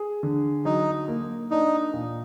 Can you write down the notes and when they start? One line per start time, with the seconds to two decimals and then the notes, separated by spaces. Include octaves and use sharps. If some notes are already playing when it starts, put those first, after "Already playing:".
Already playing: G#4
0.23 D3
0.65 F#3 D#4
1.08 A#3
1.51 D4 D#4
1.94 A#2